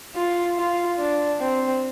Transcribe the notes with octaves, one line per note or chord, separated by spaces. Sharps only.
F4
F4
D4
C4